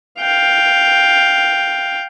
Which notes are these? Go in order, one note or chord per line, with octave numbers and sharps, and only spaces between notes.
F5 G5